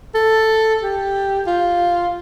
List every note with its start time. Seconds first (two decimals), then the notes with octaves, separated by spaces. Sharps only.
0.15 A4
0.82 G4
1.47 F4